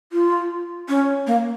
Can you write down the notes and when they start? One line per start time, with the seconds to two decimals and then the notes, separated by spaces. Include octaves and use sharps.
0.13 F4
0.89 C#4
1.27 A#3